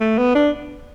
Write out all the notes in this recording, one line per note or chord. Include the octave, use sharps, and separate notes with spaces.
A3
B3
D4